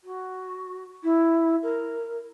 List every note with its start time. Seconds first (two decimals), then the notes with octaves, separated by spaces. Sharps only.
0.03 F#4
1.03 E4
1.62 A#4